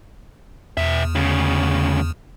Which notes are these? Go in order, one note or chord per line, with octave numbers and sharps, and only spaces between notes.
E2 B2 E5
D2 C#3